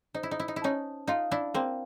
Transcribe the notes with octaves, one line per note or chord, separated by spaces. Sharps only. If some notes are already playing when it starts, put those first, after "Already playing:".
D#4 C5
E4
D#4
E4
D#4
E4
C#4 D#4 A5
D#4 F4 F5
D4 E4
A#3 C4 F5